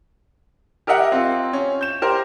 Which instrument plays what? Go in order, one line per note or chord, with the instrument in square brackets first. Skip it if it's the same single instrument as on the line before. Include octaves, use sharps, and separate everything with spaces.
[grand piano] G4 A#4 D#5 E5 F#5
C4 F4
C#4
G6 E7
G4 A#4 C5